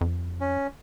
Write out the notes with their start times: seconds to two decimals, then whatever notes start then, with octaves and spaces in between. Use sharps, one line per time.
0.01 F2
0.41 C#4